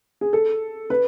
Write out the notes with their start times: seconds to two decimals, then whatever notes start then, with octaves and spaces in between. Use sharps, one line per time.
0.21 G#4
0.33 A4
0.90 B4